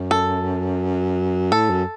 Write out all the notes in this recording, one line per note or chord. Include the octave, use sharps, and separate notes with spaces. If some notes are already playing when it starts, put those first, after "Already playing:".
Already playing: F#2
A4
A2 A4
F#2